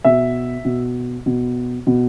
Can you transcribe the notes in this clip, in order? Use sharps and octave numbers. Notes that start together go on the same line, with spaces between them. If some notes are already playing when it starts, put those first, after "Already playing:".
B2 E5
B2
B2
B2